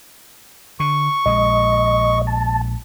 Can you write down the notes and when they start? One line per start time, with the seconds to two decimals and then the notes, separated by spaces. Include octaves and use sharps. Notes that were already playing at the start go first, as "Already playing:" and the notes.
0.80 D3 C#6
1.26 A#1 G#3 D#5
2.27 A5